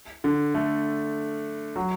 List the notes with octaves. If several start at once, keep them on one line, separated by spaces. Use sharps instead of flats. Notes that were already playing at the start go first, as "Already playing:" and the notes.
D3
A3
F#3